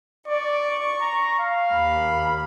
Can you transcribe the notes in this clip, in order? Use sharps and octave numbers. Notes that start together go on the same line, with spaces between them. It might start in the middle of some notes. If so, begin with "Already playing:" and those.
D5 C#6
A#5
F5
D#2 B5